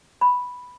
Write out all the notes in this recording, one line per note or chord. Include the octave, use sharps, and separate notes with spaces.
B5